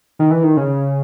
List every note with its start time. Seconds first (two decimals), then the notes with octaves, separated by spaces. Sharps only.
0.19 D#3
0.31 E3
0.43 D#3
0.57 C#3